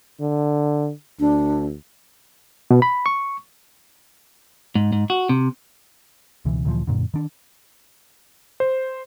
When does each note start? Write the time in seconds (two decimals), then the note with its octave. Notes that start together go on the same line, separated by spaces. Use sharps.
0.21 D3
1.20 D2 D4
2.71 B2
2.82 B5
3.06 C#6
4.75 G#2
4.92 G#2
5.10 F#4
5.29 C3
6.45 C#2 B2 E3
6.65 D2 A#2 E3 F3
6.87 F#2 A#2 D3
7.14 D#3 D4
8.60 C5